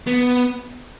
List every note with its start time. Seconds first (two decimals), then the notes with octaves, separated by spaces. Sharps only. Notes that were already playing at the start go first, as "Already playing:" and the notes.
0.07 B3